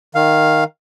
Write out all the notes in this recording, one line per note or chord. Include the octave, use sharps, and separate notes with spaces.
D#3 F5